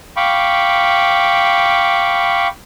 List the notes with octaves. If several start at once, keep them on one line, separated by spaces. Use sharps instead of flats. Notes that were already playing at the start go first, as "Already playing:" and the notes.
F5 G5 B5 C#6 D6